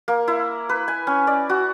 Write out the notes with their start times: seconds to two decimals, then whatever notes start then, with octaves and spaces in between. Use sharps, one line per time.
0.08 A#3
0.28 E4
0.69 B4
0.88 G#5
1.07 C#4
1.27 D5
1.49 F#4